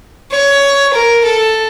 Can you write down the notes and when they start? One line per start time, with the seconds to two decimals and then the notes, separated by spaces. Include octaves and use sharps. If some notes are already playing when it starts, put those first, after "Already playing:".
0.31 C#5
0.93 A#4
1.24 A4